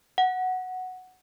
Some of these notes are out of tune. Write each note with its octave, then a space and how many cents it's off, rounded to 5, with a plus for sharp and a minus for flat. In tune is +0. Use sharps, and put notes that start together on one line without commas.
F#5 +0